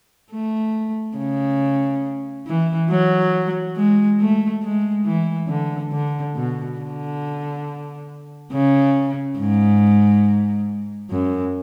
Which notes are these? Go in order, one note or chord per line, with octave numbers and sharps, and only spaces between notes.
A3
C#3
E3
F#3
G#3
A3
G#3
E3
D3
D3
B2
D3
C#3
G#2
F#2